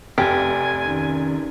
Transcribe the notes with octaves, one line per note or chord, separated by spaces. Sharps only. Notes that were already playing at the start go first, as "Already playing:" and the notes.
F1 G4 G#5
D#3 C#4 D#4